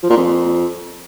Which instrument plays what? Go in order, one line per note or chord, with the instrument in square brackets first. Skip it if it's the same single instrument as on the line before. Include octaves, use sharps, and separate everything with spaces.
[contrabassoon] F3
A#2
F2